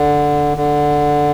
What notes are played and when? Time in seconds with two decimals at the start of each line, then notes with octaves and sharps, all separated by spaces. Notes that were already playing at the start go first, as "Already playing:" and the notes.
Already playing: D3
0.57 D3